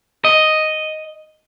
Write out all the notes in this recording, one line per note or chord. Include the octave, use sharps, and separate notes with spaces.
D#5